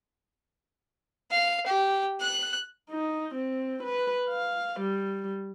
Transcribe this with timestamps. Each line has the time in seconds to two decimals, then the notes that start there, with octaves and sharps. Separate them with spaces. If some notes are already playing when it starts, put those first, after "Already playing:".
1.31 F5
1.67 G4
2.20 F#6
2.91 D#4
3.35 C4
3.83 B4
4.30 F5
4.80 G3